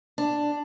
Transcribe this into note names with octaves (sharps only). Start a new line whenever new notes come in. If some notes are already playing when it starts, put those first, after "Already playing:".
D4